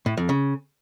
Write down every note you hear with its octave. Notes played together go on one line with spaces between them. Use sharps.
A2
F2
C#3